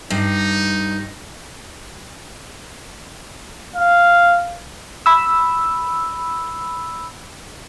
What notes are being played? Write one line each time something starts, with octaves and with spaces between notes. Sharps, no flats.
G2 D#4
F5
B5 E6